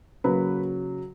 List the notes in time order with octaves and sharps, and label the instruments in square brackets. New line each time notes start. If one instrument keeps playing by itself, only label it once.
[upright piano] C#3 F#3 A#3 B4